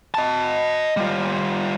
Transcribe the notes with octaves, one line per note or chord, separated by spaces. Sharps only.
D#5 A5
G3 F4